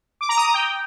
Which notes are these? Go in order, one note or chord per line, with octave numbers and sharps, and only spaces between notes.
D6
A#5
D#6
A#5
G5